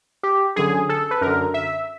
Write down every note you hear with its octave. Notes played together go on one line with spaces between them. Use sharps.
G4
F#2 D3 G#4
A4
B4
F#2 D3 A#4
E5